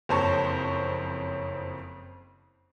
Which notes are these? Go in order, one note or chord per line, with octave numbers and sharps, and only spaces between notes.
F#1 F2 C5 C#5 A5 C#6